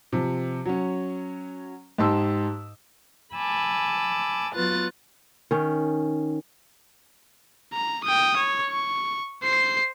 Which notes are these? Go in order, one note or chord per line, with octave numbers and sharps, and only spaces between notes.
C3 F3
F#3 C#4
G#2 D#4 G4 A5 C6 E6
G#5 A5 B5 D6 E6
F#3 B3 F4 B4 F#6 A6
D#3 C#4
A#5
G5 D#6
C#5
C#6
C5 C7